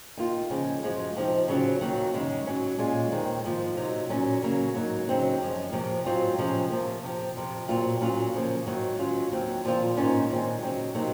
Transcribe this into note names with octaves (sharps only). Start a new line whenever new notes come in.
D#3 A#3 F4
C#3 F3 G#3
F#2 F3 G#3 C#4 F4
F2 C3 F3 C4 D#4
C#3 F#3 C#4 F4
D#2 D#3 F#3 A#3
F#2 C#3 G#3 D#4
G#2 F#3 C#4
A#2 G#3 C#4 F4
D#2 D#3 G#3 C4
G#2 F3 A#3 F4
C3 F#3 A#3 D#4
A#2 F#3 C#4
C#3 F#3 A#3
G#2 F#3 A#3 D#4
C#3 F#3 C4 D#4
F#2 F3 G#3
F2 C3 F3 A#3
G#2 F#3 C4 F4
C3 F3 G#3 C#4
C3 F3 A#3
F2 C3 F3
F2 C3 F3
A#2 F#3 C4 F4
A#2 F#3 C#4 F4
C#3 F3 A#3
G#2 D#3 F#3
G#2 F#3 C#4 F4
D#2 D#3 F#3 C4
A#2 F3 C4 F4
G#2 D#3 A#3 C#4 F4
A#2 G#3 C4
C#3 F#3 C4 D#4
C3 F#3 A#3 D#4